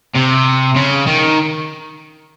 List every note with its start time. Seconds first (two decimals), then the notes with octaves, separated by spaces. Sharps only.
0.16 C3
0.76 C#3
1.07 D#3